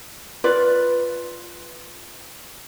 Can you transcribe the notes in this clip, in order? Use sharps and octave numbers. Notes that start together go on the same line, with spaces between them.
F4 B4 D5